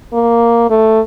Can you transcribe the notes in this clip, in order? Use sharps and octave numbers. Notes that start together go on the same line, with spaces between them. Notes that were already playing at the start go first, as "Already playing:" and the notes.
A#3
A3